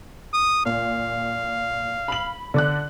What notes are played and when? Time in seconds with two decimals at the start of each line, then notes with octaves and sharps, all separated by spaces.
0.33 D#6
0.66 A#2 F5
2.08 B5 F#7
2.54 D3 D5 F#6